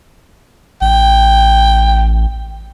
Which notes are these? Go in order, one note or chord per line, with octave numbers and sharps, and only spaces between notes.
A1 G5